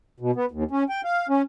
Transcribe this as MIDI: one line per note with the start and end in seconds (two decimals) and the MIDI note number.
0.20 0.31 47
0.35 0.46 59
0.51 0.64 39
0.71 0.84 61
0.89 1.01 79
1.04 1.27 77
1.29 1.42 61